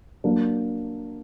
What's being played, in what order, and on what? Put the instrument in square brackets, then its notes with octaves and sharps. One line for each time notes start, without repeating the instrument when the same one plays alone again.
[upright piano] F#3 A#3 D4